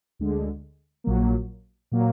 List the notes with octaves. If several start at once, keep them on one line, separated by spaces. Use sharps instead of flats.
D2 D3 G#3
A#1 A#2 F#3 A#3
A#2 F#3 A#3